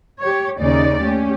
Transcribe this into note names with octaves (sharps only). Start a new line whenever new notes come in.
G4 C#5
D#2 C#3 C#4 D#4 D5
A3 C#4 G4